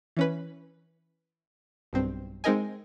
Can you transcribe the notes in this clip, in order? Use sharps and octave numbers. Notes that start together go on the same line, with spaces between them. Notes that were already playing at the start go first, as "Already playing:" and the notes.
E3 C#4 B4
B1 G2 C4
G#3 C4 D#4 A#4 D#5 G#5